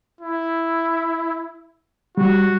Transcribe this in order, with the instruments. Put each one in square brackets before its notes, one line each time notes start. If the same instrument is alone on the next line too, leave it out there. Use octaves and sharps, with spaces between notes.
[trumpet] E4
[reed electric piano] G3 [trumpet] F#4